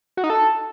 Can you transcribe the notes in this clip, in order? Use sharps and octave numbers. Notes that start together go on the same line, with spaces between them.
F#4
D#4
A4